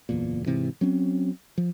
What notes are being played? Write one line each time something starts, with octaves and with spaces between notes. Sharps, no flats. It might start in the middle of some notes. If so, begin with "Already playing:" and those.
F#1 E2 A#2
G#2 C3 E3
F#3 C4 C#4
F3